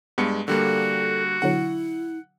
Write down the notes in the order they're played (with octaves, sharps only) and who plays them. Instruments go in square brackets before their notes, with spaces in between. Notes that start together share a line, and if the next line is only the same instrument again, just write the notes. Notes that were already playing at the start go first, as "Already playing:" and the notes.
[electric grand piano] G2 G#3 C#7 [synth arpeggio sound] B3
[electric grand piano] D3 G3 A#3 [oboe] F#4 [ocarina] A4
[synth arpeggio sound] B2 D3 F#3 [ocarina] E4 [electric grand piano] F#5